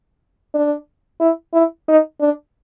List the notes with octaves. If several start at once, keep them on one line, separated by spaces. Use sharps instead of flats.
D4
E4
E4
D#4
D4